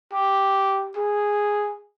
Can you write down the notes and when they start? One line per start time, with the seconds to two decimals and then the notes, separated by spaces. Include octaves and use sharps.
0.13 G4
0.96 G#4